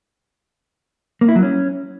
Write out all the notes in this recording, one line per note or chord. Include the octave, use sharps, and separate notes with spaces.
A#3
E4
F#3
C#4